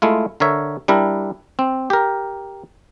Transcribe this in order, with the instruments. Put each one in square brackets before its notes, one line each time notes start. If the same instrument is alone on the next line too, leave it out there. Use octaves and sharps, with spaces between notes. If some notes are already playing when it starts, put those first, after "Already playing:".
[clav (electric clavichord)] G#3 A3 E4 F4
D3 A#4 C#5 E5
G3 D4 E4 A#4
C4
G4 A#4